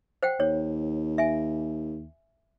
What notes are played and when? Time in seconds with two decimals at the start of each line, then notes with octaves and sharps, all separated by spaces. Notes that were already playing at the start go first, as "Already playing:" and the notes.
0.23 C5 F#5 G5
0.40 D#2 C#5
1.18 E5 G#5